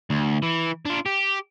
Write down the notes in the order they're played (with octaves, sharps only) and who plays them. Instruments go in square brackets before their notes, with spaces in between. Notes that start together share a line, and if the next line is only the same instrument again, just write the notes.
[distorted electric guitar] D2
E3
D4 F4
G4